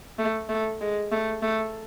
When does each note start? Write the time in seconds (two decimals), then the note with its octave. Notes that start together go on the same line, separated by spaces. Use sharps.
0.18 A3
0.49 A3
0.81 G#3
1.12 A3
1.42 A3